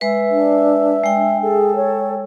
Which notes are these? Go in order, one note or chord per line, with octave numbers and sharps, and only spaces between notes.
G#3 B4 E5
D4
G#3 G5
G#4 A4
C#5